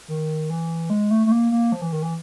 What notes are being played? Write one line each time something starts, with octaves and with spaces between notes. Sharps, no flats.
D#3
E3
G#3
A3
A3
A#3
A#3
F3
E3
D#3
E3